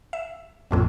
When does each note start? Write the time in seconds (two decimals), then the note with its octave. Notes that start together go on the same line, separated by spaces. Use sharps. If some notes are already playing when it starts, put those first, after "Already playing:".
0.13 E5
0.71 A#1 F2 A2